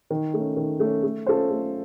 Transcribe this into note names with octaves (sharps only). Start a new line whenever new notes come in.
D#3
A3 C#4
D#3
A3 C#4
A3
C#4 F4 A4 C5
A3